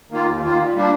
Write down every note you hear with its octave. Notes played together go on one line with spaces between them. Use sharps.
D#3 A#3 F4
D#2
D#3 A#3 F4
A#2
G3 A#3 D4